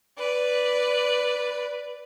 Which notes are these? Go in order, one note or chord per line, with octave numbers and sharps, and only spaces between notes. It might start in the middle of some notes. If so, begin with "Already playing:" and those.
B4 D5